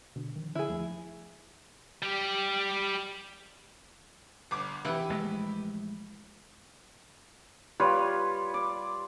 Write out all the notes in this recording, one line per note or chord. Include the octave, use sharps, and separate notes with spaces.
B2 D3 D4
D#3 F3
D3 E4 G#4
E2 F3 A3
G3 G4
G1 D6
C3 E3 E4 G4 B4 E5 F#5
A#1 G#3 A3
G3 F4 B4 C#5
D5